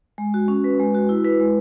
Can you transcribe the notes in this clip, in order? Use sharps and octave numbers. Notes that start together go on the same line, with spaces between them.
G#3
F#4
C#4
B4
G#3
F#4
E4
B4
G#3